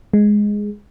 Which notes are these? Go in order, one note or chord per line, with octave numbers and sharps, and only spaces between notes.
G#3